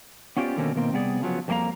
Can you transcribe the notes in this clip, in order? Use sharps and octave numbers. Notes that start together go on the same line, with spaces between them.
B3 C#4 F4 G4 C5 D5
B2 D3 D#3 A#3 C4 C#4
B2 D#3 A#3 C4
C3 G3 B3 G#4 D5
C#3 F3 F#3 B3
F2 G3 A#3 D4 F5 A#5